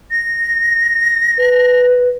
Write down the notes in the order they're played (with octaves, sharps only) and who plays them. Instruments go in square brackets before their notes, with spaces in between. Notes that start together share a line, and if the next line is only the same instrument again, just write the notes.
[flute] A#6
[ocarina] B4